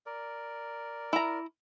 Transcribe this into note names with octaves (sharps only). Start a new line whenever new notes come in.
A#4 D5
E4 A#5